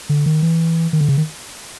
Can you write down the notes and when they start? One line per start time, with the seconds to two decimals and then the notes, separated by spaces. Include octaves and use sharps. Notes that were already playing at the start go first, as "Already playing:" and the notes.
0.09 D3
0.26 D#3
0.42 E3
0.93 D#3
1.01 D3
1.09 C#3
1.17 D#3